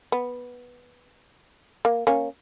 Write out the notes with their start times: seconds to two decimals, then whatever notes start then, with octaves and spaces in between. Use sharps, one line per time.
0.12 B3
1.85 A#3
2.07 A#3 C#4